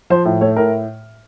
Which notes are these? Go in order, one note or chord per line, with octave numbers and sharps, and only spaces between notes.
F3 C5
A2
A3 C#5
A2 A#4